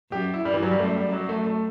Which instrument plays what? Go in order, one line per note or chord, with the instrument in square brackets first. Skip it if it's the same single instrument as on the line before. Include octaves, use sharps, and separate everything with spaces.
[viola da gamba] F#2 [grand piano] G4
[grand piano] E4
[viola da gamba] G2 [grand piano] G3
[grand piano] E3
F#3
G3
[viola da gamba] F#2 [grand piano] A3
[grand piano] G3
F#3
A3
A3